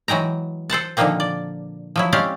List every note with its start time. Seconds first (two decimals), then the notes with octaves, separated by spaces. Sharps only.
0.08 E3 F#3 G#3 G5 A#5
0.70 A4 C5 F#5 A5
0.97 A#2 D3 D#3 F3 A#3 C4
1.20 D5
1.96 F3 F#3 E4
2.12 G#3 C4 C#4 G4 D5 F5